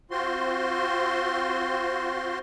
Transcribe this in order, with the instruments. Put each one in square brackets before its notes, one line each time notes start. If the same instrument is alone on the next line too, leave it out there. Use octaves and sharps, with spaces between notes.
[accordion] C4 F4 F#4 C5 C6